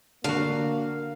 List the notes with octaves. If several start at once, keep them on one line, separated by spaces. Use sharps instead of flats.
D3 A#3 F#4 F5